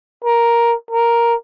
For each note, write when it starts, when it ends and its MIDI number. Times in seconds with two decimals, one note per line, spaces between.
0.24 0.75 70
0.91 1.34 70